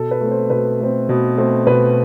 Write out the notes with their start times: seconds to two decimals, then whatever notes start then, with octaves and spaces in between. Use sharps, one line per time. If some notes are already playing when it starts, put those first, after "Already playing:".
Already playing: B2 A4
0.11 B4
0.21 A3
0.26 C4
0.31 C5
0.50 B2 B4
0.80 A3 C4
1.09 B2
1.38 A3 C4
1.67 B2 B4